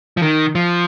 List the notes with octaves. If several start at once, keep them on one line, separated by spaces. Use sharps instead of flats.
F3
D#3
F3